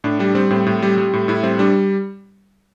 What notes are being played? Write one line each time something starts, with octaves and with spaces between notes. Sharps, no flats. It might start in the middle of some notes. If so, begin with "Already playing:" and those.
A2 D4
G3 D4
G3 C4
A2 C4
A2
G3
G3
A2
A2 E4
G3 C4
G3 D4